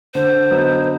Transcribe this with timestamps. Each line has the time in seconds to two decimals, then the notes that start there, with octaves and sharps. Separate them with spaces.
0.14 D3 C5
0.51 F#3 B3 D#4